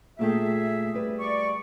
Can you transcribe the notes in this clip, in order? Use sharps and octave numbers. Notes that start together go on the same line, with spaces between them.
A#2 A3 G#4 E5 G5
G3 B4
D5 C#6